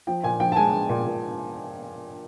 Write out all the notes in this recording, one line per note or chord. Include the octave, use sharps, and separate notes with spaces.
F3 G5
A#2 G#5
F3 G5
A5
G#3 G#5
G#3
A#2
A#2